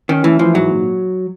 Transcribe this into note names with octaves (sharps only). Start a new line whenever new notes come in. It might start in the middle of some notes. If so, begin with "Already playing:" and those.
D#3 C#4
E3 A3
E3 F3
G#2 F#3
A#2